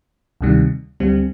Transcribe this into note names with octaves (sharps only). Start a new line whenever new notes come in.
D2 C3 D#3 G3
D2 D3 G3 C4